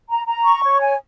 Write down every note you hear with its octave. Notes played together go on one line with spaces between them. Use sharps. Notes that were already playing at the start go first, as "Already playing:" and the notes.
A#5
A#5
C#6
C#5
G#5